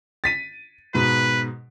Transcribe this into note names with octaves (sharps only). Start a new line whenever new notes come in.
A6 B6 D#7
G#2 B2 B4